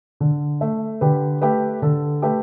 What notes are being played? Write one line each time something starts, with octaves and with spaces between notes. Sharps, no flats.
D3
A3
D3 G4 B4
A3 G4 B4
D3 A4
A3 G4 B4